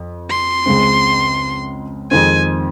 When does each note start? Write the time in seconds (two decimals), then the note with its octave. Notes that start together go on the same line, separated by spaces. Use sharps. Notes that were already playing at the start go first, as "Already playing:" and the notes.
Already playing: F2
0.30 C6
0.66 C#2 C#3 G#3 C4
2.11 F2 D#3 G#3 C4 G#5